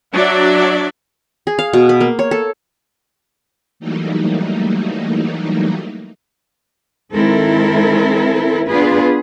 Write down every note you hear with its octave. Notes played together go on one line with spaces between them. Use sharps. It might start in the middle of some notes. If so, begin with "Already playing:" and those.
F#3 D4 F#4 D5 E5
G#4
F5
B2
B4
A#3
C#5
A4
E3 F#3 G3 A3 A#3 D#4
D#3 G#3 C4 E4 A4 A#4
B3 D4 F4 G#4 B4